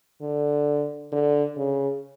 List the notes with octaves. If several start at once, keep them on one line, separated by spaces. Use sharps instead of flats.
D3
D3
C#3